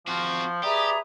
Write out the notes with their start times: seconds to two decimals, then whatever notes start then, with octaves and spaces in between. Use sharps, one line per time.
0.07 F3 C4 F#4
0.63 G4 G#4 B4 D5 E5 A#5 D#6